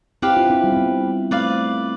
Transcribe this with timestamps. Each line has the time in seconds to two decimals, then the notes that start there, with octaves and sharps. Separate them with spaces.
0.22 C4 E4 G4 B4 F5
0.37 D4 F4
0.50 C4 E4
0.63 G3 B3
0.72 C4
0.76 G3 B3
1.31 A3 C4 B4 D5 F5